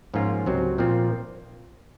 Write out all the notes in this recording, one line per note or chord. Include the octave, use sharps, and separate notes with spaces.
G#2 F3 A#3 C#4 F4
C#2 C3 F#3 C4
A#2 F3 C4 F4